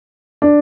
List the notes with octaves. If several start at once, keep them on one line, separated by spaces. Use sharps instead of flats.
D4